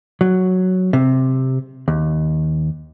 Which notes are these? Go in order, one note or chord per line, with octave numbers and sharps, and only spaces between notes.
F#3
C3
D#2